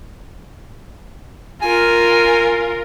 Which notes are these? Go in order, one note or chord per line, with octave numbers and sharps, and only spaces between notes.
F4 A#4 G#5